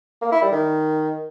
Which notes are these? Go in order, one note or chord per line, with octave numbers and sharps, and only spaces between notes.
A#3
E4
G3
D#3